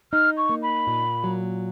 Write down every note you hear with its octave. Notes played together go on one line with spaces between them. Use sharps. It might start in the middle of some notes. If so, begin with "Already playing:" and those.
D#4 F6
C#6
A#3
B5
A#2
F#3